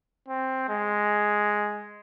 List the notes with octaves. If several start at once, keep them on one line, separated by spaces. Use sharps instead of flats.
C4
G#3